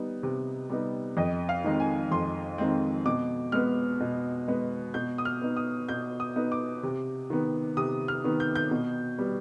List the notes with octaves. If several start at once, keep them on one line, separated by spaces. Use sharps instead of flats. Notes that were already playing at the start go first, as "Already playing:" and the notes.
Already playing: G3 B3 D#4
C3
G3 B3 D#4
F2 D#5
F5
D#3 G#3 C4
G#5
F2 C6
D#3 G#3 C4
B2 D6
G#3 B3 F6
B2
G#3 B3
B2 G6
D#6
F6
B3 D#4
D#6
B2 G6
D#6
B3 D#4
D6
C3
D#3 B3
C3 D#6
F6
D#3 B3
G6
G6
B2
G3 B3